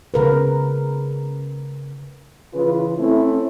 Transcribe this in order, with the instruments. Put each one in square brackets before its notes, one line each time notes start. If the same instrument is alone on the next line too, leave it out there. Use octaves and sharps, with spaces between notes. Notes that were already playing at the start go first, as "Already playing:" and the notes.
[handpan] C#3 A#4 B4
[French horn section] C#3 E3 F4 B4
A3 C4 C#4 E4